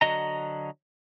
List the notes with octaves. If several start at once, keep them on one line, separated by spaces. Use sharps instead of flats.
D3 F#3 F#4 D#5 A#5